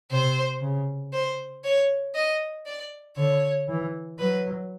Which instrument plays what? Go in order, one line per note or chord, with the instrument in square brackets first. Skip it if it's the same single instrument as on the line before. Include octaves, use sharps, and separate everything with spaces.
[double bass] C3 [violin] C5
[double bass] C#3
[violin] C5
C#5
D#5
D5
[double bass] D3 [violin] C#5
[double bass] E3
[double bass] F#3 [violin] B4